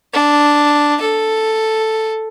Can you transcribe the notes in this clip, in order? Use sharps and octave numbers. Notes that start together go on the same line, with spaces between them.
D4
A4